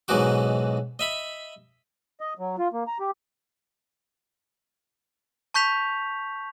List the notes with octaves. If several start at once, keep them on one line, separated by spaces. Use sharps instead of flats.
B1 G#2 E3 D#4 F#4 D6
D#5 E5 B5
D#5
F#3
F4
A#3
A#5
G4
A5 C#6 G6 B6 F7